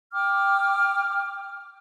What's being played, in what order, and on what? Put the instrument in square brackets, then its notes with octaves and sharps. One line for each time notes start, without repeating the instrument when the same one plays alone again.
[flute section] G5 D6 F6